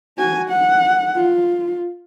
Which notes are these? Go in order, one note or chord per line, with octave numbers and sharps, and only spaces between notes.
F#4 G#5
F#5
F4